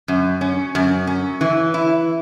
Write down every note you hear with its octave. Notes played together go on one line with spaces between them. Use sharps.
F#2
C#4
F#2
C#4
E3
E4